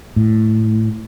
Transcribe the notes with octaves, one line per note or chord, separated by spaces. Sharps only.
A2